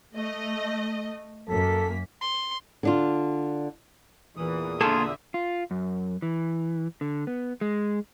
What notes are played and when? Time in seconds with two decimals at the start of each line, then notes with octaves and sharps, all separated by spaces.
0.15 A3 D#5
1.48 F#2 A#3 A4 B6
2.21 C6
2.83 D3 D4 F4
4.37 E2 A#2 E3 D#6
4.81 D3 A#3 F4 G#4 A4 E5 A5
5.34 F4
5.71 F#2
6.22 E3
7.01 D3
7.27 B3
7.61 G#3